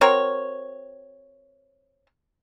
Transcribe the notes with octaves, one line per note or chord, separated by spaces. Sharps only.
C4 F#4 A#4 C#5